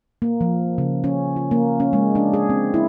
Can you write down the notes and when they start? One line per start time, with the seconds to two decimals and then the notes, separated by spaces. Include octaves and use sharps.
0.22 A#3
0.41 F3
0.78 C#3
1.04 C#4
1.36 F4
1.51 A#3
1.80 C#4
1.93 G#3
2.15 D4
2.33 G#4
2.49 C4
2.74 E4